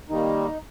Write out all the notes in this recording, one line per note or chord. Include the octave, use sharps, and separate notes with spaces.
D#3 G3 A#3 D#4